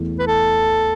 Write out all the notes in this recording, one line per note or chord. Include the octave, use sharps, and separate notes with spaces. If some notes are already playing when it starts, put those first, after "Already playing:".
Already playing: E2 E3 A3
B4
A4